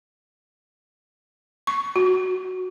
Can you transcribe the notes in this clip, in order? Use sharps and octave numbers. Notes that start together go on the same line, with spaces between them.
C#6
F#4